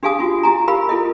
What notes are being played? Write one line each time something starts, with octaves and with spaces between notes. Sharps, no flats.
D4 G4 G#4 F5 G#5 D#6
D4 F4 F#4
E4 G4 G#5 A#5
G4 A#4 F5 B5 E6
E4 F4 A4 A#4 D#5